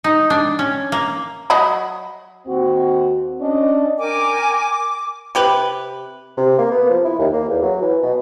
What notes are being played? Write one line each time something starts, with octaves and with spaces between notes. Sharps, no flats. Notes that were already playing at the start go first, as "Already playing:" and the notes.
D#4
D4
C#4
A#3
F#3 D#5 B5
D#2 C4 F#4
C#4 D4 D#5
A#4 G5 G#5 D6
C3 G4 B4
C3
A#3
B3
F3
E4
D#2
A#3
E2
F#3
E3
B2